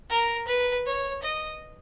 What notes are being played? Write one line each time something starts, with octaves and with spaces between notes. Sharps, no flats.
A#4
B4
C#5
D#5